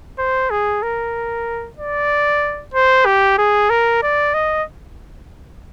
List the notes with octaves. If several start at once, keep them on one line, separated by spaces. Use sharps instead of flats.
C5
G#4
A#4
D5
C5
G4
G#4
A#4
D5
D#5